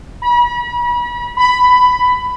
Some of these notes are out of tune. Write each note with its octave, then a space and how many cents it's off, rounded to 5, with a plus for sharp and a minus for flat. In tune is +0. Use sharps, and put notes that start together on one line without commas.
B5 -35
B5 +10